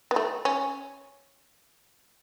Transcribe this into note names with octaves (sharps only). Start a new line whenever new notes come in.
B3
A3
C#4